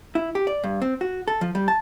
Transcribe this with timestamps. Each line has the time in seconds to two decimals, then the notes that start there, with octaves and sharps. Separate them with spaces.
0.15 E4
0.35 G4
0.47 D5
0.63 G2
0.82 C4
1.01 F#4
1.28 A4
1.41 F3
1.55 G3
1.68 A5